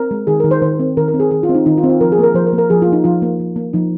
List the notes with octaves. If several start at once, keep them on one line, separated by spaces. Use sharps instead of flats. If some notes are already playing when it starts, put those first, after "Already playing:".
Already playing: C4 A#4
G#3
D#3 G#4
D#3 A#4
C5
D#3 C5
C4
D#3 A#4
A#4
C4
G#4
D#3 G#4
F4
C4
D#4
D#3 D#4
F4
C4
F4
F3 A#4
G#4
A#3 A#4
F3 C5
A#4
A#3
A#4
F3 G#4
F4
A#3 D#4
F3 F4
A#3
F3
A#3
F3 D#4